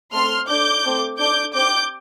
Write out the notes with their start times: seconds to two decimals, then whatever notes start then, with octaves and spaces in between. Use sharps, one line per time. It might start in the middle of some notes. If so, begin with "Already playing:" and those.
0.12 A3 C4 A4 C6 F6
0.48 D4 A4 D6 G6
0.83 A3 C4 A4
1.19 D4 A4 D6 G6
1.54 C4 G4 D6 G6